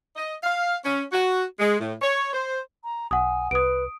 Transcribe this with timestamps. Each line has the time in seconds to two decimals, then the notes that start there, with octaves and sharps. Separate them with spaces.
0.16 D#5
0.43 F5
0.84 C#4
1.11 F#4
1.59 G#3
1.79 A2
2.02 C#5
2.33 C5
2.84 A#5
3.11 B1 F#5 G#5 D#6
3.51 C2 B4 D#6 D7